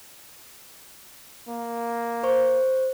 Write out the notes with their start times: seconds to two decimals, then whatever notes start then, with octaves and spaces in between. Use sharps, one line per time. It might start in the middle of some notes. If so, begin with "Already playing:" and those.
1.48 A#3
2.23 C5 C#6